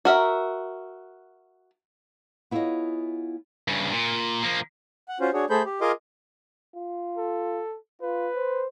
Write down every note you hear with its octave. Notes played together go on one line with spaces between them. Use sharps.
F#4 A#4 E5
B3 E4 F4 G#4 C#5 D#5
G2 C#3
A#2
F3 A#3
F#5
C#4 F4 F#4 C5
D4 F#4 G#4 C#5
A3 G#4 A4 C5 B5 G6
G4
F4 G#4 A#4 D#5 C6 D6
F4
A4
F4 B4
C5